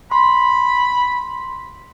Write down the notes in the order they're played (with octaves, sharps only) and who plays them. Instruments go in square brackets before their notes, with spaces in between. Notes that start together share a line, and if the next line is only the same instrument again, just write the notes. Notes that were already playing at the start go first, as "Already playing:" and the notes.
[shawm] B5 [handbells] C6